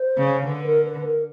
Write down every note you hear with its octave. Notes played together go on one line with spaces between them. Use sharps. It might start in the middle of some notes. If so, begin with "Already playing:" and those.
Already playing: C5
C#3
D3 B4
A#4
B4
A#4